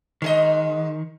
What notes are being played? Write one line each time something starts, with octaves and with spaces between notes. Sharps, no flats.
G#2 D#3 G#4 D#5